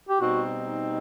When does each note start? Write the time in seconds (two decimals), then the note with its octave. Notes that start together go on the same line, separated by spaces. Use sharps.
0.09 G4
0.20 B2 G3 C4 D#4 F#4